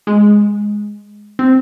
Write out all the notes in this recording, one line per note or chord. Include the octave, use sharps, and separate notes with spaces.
G#3
C4